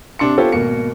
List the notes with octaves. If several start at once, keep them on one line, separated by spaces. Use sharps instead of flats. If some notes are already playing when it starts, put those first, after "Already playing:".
C3 D4 C6 C#7
B3 F4 G4 A4 C5 C#5
G#1 B2 A#3 C#7